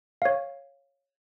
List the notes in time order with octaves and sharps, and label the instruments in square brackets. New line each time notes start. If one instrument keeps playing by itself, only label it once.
[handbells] C#5 F5